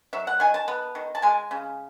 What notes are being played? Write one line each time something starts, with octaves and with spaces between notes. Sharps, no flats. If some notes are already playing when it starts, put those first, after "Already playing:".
F#3 E5
F#5
D#3 G#5
A5
B3
D#3
A5
G#3 G#5
C#3